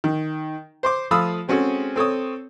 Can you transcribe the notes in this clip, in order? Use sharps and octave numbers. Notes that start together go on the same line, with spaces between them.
D#3
C5 C6 D6
F3 A3 F5 B5 D#6 E6
G#3 C4 C#4 F#4 G#4 A4
C4 A4 C#5 D#6